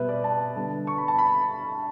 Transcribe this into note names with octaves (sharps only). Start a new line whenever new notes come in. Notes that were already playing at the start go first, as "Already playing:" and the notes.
Already playing: B2 G3 B3 B4 E5
D5
A5
D3 G3 B3
C#6
B5
A5
B5